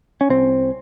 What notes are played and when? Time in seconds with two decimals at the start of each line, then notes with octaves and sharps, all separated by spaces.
0.21 C#4
0.29 C2 C4